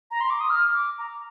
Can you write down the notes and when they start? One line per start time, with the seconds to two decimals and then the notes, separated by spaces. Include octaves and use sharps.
0.11 A#5
0.21 C6
0.30 D6
0.40 D#6
0.50 F6
0.74 D6
0.98 A#5